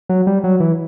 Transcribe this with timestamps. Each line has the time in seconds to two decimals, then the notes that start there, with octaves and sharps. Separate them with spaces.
0.09 F#3
0.27 G3
0.44 F#3
0.60 E3